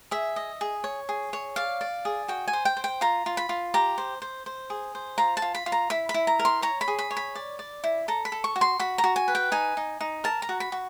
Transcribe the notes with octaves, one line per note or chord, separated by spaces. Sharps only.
G#4 E5
D#5
G#4
C#5
G#4
C#5
D5 F5
D5
G#4
F#4 G5
G#5
C5
G5
C5
G5
F4 A#5
F4
B5
F4
G4 A#5
C5
C5
C5
G#4
C5
F4 A#5
A5
F4
B5
F4
A#5
E4 B5
B5
E4
A#5
A#4
C6
C#5 A#5
B5
G#4
B5
C#5
B5
D5
D5
E4
A4 A#5
B5
A4
C#6
F#4
C6
F#4 B5
A#5
F#4
G#5
B4
G5
D#4 G#5
D#4
D#4
A#4 A5
A#5
F#4
B5
F#4